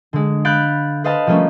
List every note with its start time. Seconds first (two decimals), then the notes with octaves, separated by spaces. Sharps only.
0.13 D3 G#3
0.45 F5 B5 F#6 G6 A6 D7
1.04 B4 C5 D#5 F5 A5
1.27 F3 G3 A3 A#3 C#4